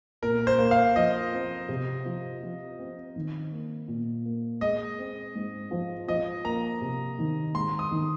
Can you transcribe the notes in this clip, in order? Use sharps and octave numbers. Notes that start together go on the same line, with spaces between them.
A#2 A#4
C5
A#3
F5
F3 D#5
C4
C3
F3
F3
C4
D#3
A#3
A#2
A#3
G#3 D#5
C4
G#2
F3
F3 D#5
A#3 A#5
C3
D#3
G#2 C6
D#6
D#3